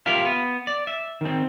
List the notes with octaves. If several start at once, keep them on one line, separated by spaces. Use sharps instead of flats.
F4 G4 A#4 E5 F5
B3
D5
E5
D#3 C4